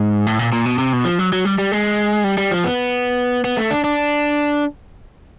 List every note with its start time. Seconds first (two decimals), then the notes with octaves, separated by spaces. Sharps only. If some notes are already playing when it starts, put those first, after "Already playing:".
Already playing: G#2
0.27 A2
0.39 A#2
0.53 A#2
0.66 B2
0.78 C3
0.93 B2
1.05 F3
1.19 F#3
1.32 F#3
1.45 G3
1.58 G3
1.72 G#3
2.24 G3
2.38 G3
2.51 F3
2.64 B3
3.44 B3
3.57 A3
3.71 D4
3.84 D4